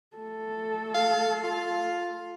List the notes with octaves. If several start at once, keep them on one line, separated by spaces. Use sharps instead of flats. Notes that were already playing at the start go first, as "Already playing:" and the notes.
A3 A4
F5
F4